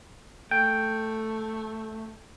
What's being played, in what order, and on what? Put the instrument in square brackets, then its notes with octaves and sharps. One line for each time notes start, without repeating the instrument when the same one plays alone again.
[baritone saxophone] A3 [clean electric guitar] G5